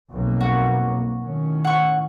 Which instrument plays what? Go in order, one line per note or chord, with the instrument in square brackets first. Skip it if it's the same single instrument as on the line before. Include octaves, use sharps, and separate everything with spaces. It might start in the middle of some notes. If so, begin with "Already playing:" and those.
[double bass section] B1 F2 A#3
[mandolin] F#4
[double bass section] A2 D#3 C#4
[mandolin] F#5 C#6